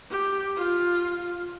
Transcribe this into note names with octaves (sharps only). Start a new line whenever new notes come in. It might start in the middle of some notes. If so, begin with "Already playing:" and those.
G4
F4